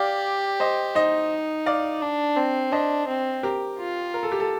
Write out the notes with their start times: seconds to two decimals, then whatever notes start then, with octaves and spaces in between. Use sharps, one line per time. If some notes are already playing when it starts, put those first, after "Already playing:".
Already playing: G4 D5 F5
0.60 C5 D#5
0.95 D#4 C5 D#5
1.66 D5 F5
2.02 D4
2.36 C4
2.72 D4 C5 D#5
3.07 C4
3.43 G4 A#4
3.78 F4
4.14 A#4
4.23 A4
4.32 G4
4.40 A4